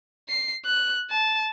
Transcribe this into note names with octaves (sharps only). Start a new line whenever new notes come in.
C7
F#6
A5